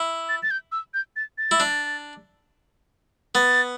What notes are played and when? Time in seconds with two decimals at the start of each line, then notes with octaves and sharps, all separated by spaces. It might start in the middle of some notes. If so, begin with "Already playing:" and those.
Already playing: E4
0.29 A6
0.43 A6
0.51 G6
0.72 E6
0.94 G6
1.16 A6
1.38 A6
1.51 E4
1.60 D4
3.35 B3 A6